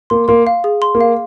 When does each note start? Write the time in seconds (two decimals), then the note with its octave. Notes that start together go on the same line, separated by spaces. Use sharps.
0.10 A#3 C6
0.28 A#3 C6
0.47 F5
0.64 G#4
0.82 C6
0.95 A#3
1.01 F5